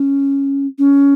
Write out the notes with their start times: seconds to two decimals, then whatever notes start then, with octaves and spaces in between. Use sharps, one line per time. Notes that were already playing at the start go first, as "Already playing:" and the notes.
Already playing: C#4
0.79 C#4